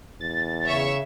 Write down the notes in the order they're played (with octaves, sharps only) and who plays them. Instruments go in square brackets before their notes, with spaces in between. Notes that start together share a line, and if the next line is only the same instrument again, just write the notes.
[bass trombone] E2 [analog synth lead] A6
[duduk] C#3 [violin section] C#5 E5 C#6